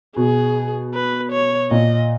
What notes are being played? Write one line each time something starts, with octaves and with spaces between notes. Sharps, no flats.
B2 G#4
B4
C#5
A#2 D#5